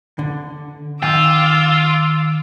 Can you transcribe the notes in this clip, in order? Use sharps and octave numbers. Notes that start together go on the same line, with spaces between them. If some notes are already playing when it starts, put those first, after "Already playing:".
D3
D#3 F4 G5 D6 E6